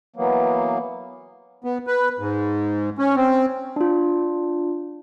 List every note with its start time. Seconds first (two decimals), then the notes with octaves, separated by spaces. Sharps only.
0.16 E3 F#3 A#3 B3
1.64 B3
1.87 B4
2.19 G#2
2.98 C#4
3.16 C4
3.76 D4 F4